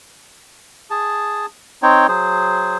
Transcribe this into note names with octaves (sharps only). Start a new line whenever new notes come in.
G#4 A5
C4 D#4 C#5 G5
F#3 G#4 C5